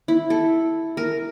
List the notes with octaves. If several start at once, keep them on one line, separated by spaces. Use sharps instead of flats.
E4
A4
A#4